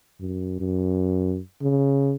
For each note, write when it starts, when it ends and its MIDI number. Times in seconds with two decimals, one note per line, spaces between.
0.20 0.58 42
0.60 1.39 42
1.62 2.16 49